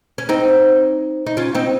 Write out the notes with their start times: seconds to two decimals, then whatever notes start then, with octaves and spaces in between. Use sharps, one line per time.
0.18 C#4
0.29 C4 D#4
1.27 D#4
1.37 C#4 F4
1.55 C4 D#4